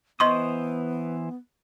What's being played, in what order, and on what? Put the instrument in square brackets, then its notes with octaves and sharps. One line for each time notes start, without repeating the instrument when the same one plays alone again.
[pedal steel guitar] E3 C5 D#6 [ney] B3 [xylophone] D#5 C6 C#6